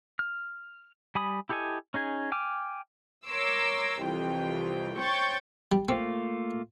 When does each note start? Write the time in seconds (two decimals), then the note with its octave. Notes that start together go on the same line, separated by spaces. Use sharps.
0.19 F6
1.15 G3 G#5 B5 D#6
1.49 E4 G4 A4 D#5 G#5
1.94 C#4 D#4 G#4 G#5
2.32 G5 G#5 D6 F6
3.26 A#4 C#5 C6 D6 E6
4.03 C2 F2 E3 F4 G5
4.98 C5 C#5 G5 C#6 G6 A6
5.72 G3
5.89 A3 A#3 C4 F4